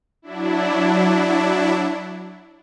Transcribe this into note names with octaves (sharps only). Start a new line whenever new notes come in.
F#3 D4 E4